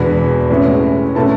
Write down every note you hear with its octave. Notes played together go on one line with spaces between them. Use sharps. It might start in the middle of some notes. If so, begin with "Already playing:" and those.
Already playing: E2 B2 G#3 D4 B4 B5
A2 E3 G#3 C#4 E4
B2 A3 C#4 E4 A4 A5